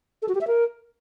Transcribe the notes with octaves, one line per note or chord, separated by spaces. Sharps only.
A4
F#4
G4
E5
A#4